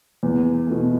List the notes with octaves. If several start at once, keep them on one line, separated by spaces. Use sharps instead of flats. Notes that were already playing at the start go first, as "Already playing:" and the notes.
E2
B2 A3